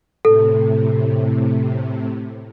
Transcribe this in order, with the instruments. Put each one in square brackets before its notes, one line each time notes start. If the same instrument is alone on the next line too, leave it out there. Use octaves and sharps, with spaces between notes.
[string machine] A2 C3 [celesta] A4